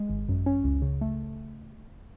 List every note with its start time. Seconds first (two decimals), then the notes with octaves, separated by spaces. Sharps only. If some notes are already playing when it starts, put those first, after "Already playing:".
Already playing: G#3
0.09 G#1
0.29 F#2
0.46 C#4
0.64 C#2
0.82 C#3
1.01 A3